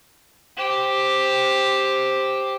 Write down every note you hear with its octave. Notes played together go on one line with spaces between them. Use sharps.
G4 C5